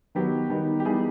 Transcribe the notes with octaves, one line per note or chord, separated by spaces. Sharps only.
D#3 F#3 B3 G4
D#3 G3 B3 D#4
G4
E3 G3 B3 D#4 G#4